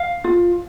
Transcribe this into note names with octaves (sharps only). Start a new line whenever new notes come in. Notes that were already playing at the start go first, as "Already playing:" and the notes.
Already playing: F5
F4